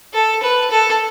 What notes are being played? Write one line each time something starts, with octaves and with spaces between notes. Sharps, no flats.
A4
B4
A4